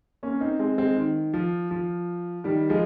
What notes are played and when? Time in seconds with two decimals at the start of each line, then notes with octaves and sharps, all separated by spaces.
0.23 A#3 C#4
0.41 C4 D#4
0.59 G#3 C4
0.78 G#3 C4
0.96 D#3
1.34 F3
1.71 F3
2.44 D#3 G3
2.70 F3 G#3